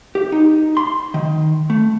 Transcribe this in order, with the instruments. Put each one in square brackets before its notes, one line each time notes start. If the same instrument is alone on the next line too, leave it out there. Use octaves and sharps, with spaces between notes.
[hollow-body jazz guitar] G4
D#4
C6
D#3
A3